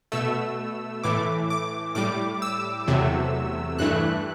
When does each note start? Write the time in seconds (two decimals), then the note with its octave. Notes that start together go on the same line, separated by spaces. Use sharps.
0.12 B2 A3 E6
1.04 A2 E3 A3 D6
1.50 D6
1.95 A2 G3 D6
2.42 E6
2.87 E2 C3 F#3 A3
3.79 G2 E3 A3 F#6